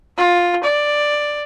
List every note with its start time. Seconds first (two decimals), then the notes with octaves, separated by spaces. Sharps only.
0.18 F4
0.64 D5